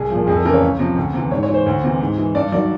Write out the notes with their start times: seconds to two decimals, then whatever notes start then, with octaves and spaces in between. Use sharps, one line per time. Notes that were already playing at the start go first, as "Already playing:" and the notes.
Already playing: C2 G#4
0.10 A#2 F3
0.27 F2 G#4
0.37 A4
0.45 C#3 E3 A#4
0.54 C#5
0.62 C#2
0.79 C3 F3
0.96 D2
1.13 C3 E3
1.31 G#2 C#5
1.43 C#5
1.49 E3 C5
1.66 D2
1.84 C3 E3
2.01 G#2
2.18 E3
2.35 G2 D5
2.52 D#3 F#3 D5